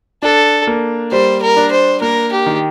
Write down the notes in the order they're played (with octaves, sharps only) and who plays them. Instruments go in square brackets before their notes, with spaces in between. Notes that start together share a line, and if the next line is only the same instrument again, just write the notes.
[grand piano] D4 [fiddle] A4
[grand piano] A#3
[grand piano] G3 [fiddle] C5
[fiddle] A#4
[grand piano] D4
[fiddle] C5
[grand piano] A#3 [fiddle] A#4
[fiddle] G4
[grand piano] D#3